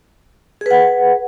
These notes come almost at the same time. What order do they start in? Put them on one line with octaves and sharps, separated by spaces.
G#4 B4 F#5